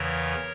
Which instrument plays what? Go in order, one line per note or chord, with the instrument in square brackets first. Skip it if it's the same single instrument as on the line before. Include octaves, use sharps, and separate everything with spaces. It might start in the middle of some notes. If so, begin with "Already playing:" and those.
Already playing: [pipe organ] E2 C#3 E3 A#4 C#5